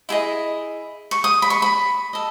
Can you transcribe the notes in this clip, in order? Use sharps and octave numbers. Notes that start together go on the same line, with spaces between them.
E4 G#4 D#5
C#6
D#6
B5
C#6
B5
A4 D#5